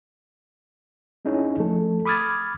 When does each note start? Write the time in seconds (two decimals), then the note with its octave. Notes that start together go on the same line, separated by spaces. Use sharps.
1.25 C4 C#4 D#4 E4 G#4 C#5
1.60 F3 A3 A4
2.05 B5 D6 D#6 F6 G#6 A6